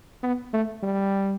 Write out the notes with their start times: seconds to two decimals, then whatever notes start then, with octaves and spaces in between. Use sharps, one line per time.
0.23 B3
0.53 A3
0.83 G3